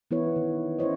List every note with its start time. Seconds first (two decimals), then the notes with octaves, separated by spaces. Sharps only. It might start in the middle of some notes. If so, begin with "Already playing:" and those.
0.11 E3 B3 E4 B4 C#5
0.36 D#3
0.79 C#4 E4 C5 C#5 D#5